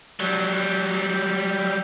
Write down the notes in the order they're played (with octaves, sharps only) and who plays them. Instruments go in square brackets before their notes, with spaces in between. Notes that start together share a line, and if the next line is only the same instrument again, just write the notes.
[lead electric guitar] F#3 G3